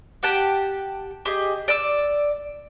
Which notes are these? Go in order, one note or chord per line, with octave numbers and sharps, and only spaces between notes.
G4 F#5 G5 A5
G4 G#4 D#5
D5 E6